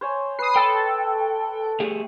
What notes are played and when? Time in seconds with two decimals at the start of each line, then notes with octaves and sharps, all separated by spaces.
0.01 C5 C#5 G#5
0.39 B4 D#6 C7
0.56 A4 G5
1.80 A3 G4 G#4